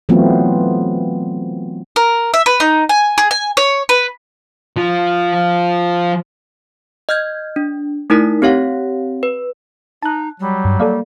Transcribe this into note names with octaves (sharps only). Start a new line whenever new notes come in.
E3 F#3 A3 B3 C4 F4
A#4
E5
B4
D#4
G#5
G#4
G#5
C#5
B4
F3 F4
D#5 F6 G6 G#6
D4
A3 D#4 E4 A#4 B6
C4 G4 C#5 F5 F#5
B4
D#4 A5 F#6
F#3 G3
G2
A#3 A4 D5 F5